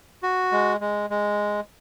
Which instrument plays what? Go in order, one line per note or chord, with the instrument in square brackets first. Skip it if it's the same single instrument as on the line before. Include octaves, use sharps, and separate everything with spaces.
[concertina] F#4
G#3
G#3
G#3